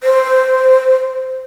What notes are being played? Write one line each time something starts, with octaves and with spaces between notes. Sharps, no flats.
C5